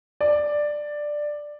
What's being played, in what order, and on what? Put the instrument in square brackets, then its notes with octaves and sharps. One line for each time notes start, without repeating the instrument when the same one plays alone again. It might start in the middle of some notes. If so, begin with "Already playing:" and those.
[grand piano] D5